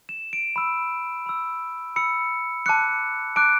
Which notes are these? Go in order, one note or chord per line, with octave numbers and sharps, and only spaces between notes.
E7
D7
B5 E6
B5 E6
B5 E6 C#7
A5 D6 F#6 C#7
A5 D6 F#6 D7